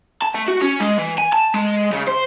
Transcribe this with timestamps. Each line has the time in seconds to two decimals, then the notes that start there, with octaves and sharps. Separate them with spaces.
0.22 A5
0.34 A3
0.48 F#4
0.61 C#4
0.80 G#3
0.98 E3
1.18 G#5
1.33 A5
1.54 G#3
1.92 C#3
2.07 C5